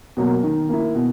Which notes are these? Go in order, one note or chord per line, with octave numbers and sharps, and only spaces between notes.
B2 F#3 A#3
D#3
A#3 E4
B2